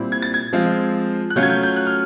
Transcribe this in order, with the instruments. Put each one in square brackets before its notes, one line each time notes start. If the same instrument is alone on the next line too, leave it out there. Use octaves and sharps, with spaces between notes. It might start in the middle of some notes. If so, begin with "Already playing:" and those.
Already playing: [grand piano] A#2 G3 C4 E4
G#6
A6
G#6
F3 G#3 C4 F4
F#6
F#3 A3 C#4 F4 G6
G#6
G6
G6
F#6
F6